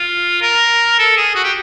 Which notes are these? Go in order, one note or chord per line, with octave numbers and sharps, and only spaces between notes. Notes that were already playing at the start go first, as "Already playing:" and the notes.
Already playing: F4
A#4
A4
G#4
F#4
G4